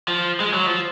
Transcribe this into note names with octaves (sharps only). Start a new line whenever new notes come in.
F3
G#3
F#3
F3